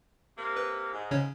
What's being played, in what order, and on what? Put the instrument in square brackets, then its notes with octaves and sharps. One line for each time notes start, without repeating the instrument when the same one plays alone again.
[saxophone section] C3 A#3
[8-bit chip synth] B4
[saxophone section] G#2
[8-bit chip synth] C#3 C#4 C#5